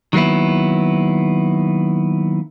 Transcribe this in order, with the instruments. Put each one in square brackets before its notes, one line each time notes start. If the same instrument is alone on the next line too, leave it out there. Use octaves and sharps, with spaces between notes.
[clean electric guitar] D#3 F#3 A#3 B3 E4